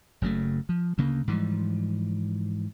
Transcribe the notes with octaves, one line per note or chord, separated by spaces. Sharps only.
F#1 C#3 F#3 A3
F3
D2 C#3 A#3
G#2 E3 F3 G3